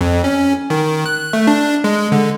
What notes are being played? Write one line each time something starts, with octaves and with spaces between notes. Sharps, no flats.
F2
C#4
D#3
F#6
A3
D4
G#3
D3